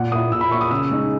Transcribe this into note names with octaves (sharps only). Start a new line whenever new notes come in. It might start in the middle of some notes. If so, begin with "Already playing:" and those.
Already playing: A#2 F#5
A#3 E4 D#6
A#2 E6
B5
A#3 E4 C#6
D#6
C#3 E6
G#3 D#4